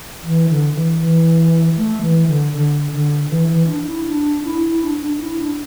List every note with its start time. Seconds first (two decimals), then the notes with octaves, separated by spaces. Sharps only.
0.24 E3
0.49 D3
0.74 E3
1.01 E3
1.76 A3
2.02 E3
2.27 D3
2.53 D3
2.91 D3
3.30 E3
3.48 E3
3.67 D4
3.87 E4
4.06 D4
4.44 E4
4.83 D4
5.01 D4
5.21 E4
5.39 D4